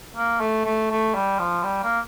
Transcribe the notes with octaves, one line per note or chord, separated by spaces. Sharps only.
A#3
A3
A3
A3
G3
F3
G3
A#3